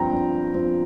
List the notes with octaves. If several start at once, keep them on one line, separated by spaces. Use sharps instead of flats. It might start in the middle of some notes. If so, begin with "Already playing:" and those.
Already playing: G2 F3 C4 G5 A#5
G2
F3 C4